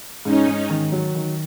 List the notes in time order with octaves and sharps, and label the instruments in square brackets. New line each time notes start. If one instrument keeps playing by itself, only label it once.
[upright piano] G#2 [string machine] C#4 D#4
[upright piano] G#2
D#3
F#3
D#3